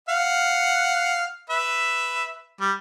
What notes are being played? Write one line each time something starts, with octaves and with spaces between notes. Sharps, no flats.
F5 F#5
B4 E5
G3